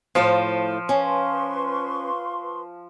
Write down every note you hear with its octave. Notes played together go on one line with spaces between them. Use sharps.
A2 F3 C5 F5
C#4 B4 C6 C#6